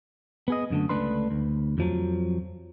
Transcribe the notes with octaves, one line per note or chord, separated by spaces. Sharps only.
B3 G#4 D#5
F#2 D3 A3
C#2 D3 A3 D4 B4 C6
D2
F2 F3 F#3